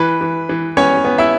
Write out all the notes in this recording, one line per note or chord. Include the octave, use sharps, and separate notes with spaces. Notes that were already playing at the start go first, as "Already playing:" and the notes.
Already playing: E3 B4
E3
E3
B3 C#4 C#5
B3
E4 E5